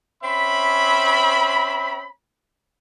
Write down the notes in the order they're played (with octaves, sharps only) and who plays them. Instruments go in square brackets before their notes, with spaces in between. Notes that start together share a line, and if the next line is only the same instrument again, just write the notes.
[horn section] C4 C#4 E5 B5